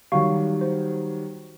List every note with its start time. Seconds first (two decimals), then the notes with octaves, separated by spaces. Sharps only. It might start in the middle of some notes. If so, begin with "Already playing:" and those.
0.12 D#3 F#3 G3 F5 C#6
0.61 C5